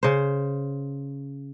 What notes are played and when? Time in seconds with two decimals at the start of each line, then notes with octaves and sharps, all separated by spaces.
0.03 C#3 C5